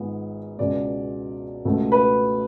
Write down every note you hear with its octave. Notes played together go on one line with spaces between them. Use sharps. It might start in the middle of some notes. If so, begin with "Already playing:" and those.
Already playing: G#1 G#2 G#3 B3 F4
C#2 B2 G#3 D5
C#2 B2 A3
B4